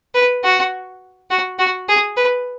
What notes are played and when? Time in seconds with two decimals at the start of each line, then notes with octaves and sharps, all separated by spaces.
0.14 B4
0.43 F#4
1.30 F#4
1.59 F#4
1.89 G#4
2.17 B4